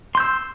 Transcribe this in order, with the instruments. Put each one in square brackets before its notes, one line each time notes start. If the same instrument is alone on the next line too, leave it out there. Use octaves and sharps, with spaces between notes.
[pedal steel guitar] C6
G6
E6